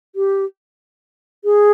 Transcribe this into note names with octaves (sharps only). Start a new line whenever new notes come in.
G4
G#4